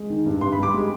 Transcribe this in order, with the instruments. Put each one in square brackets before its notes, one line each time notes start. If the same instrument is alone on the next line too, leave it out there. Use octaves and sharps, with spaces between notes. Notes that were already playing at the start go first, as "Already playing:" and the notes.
Already playing: [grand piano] G#3
D#3
G2
G2 C6
B5
G3 D6
G#3